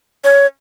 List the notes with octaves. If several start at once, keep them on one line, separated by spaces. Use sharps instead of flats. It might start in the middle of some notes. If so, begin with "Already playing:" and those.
C#5